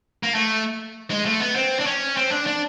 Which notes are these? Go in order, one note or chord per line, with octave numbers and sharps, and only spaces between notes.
A#3
A3
G#3
A3
B3
C4
D4
C#4
C4
D4
D4